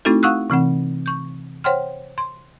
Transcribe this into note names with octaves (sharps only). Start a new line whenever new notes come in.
A3 C4 D#4 E4 F#4 A4
F5 F#5 C#6 D#6 E6 F#6
C3 E3 C4 F#5
C#6 G6
C5 C#5 F#5 G5 C6 F6
C6